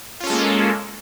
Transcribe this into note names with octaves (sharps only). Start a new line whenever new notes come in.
G#3 A#3 C#4 F4 A4